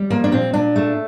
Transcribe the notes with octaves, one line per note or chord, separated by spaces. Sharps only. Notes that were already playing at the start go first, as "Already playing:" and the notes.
Already playing: G3
F3 A#3
D4
A#2 C4
A#2 D4
A3